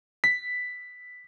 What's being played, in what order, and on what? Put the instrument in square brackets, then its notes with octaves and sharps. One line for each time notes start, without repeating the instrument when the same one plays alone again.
[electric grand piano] B6